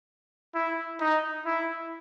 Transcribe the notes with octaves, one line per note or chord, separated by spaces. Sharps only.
E4
D#4
E4